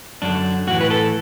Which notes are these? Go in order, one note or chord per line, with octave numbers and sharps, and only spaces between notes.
F#2 D3 D4
A2 E3 F#4
B4
A4